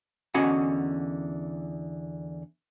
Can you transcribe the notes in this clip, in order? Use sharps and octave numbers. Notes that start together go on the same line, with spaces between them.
E2 D3 C#4 F#4 D#5 F#5